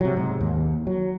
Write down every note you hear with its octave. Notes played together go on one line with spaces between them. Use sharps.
C3 F#3
G#2 C3
D#2
F#3